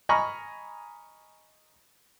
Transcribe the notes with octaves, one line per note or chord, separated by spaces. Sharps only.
D#5 G#5 A#5 B5 C#6 F6